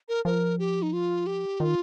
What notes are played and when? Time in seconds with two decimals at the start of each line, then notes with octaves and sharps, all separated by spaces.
0.09 A#4
0.25 F3 A#4
0.59 G4
0.82 D#4
0.93 F4
1.27 G4
1.60 D#3 F4